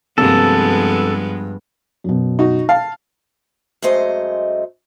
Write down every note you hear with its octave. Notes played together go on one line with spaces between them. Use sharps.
G2 C3 F3 G#3 A#3 B3 A4
F#2 B2
D#4 F#4
F5 A5
F#2 G#3 A3 C5 D#5